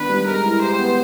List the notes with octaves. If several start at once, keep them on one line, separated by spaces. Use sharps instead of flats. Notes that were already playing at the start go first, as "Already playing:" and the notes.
Already playing: D#3 B3 D4 B4
G3
G#3 A#4
E4
G4 C5
B3